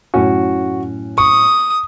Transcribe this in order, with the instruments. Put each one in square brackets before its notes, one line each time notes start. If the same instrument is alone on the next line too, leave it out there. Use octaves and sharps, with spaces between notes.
[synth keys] F#2 A2 C#4 [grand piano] F#4
[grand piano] C#6 [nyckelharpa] D#6